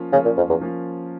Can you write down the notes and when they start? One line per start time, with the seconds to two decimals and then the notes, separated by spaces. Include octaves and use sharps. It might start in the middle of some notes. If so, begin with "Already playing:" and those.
Already playing: F3 A#3 C#4 F4
0.13 C#3 F3 A#3 C#4 F4
0.25 A#2
0.37 F2
0.50 E2
0.61 F3 A#3 C#4 F4